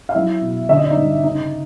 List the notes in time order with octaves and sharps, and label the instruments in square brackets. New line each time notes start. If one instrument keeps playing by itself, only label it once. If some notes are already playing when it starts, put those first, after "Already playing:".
[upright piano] F5
F#3 E4 E5
B2
D3 E5
D#5
D5
D#4 D#5
G2
C#3 D#4 D#5